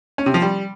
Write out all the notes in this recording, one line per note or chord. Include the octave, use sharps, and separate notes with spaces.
C#4
C3
F3
G3